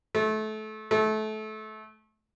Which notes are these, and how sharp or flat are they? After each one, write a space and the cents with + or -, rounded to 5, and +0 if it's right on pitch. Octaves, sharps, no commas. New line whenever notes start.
A3 -25
A3 -25